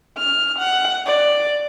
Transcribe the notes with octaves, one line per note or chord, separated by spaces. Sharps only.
F6
F#5
D5